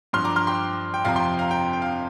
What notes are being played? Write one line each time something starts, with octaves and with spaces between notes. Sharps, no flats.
G2 F3 C6 F6
A#5 D6
C6 F6
G5 C6
G5
F2 C3 F3 F5 A#5
G5 C6
F5 A#5
G5
G5
F5